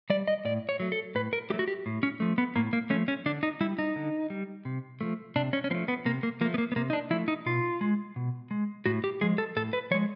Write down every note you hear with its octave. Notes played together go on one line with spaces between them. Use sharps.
G3 D5
D#5
A2 D5
C#5
F#3 A3
A4
A2 B4
A#4
F#3 A3 G4
F#4
G4
A2
C#4
F3 A3
B3
A2 A#3
A#3
F3 A3 C#4
C#4
D3 D4
D#4
G3 E4
D#4
D3
G3
C3
F3 A3
C3 D4
C#4
C#4
F3 A3 C4
B3
C3 A#3
A#3
F3 A3 A#3
B3
A#3
B3
C3 A#3
D#4
D4
F3 A3 E4
D#4
B2 F4
G#3
B2
G#3
A2 F#4
G4
F3 G#3 G#4
A4
A2 A4
B4
F3 G#3 C#5